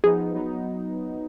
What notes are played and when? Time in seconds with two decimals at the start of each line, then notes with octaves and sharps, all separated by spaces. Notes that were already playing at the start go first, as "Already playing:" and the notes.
0.04 F3 B3 D#4 G#4
0.32 F#3 B3 D#4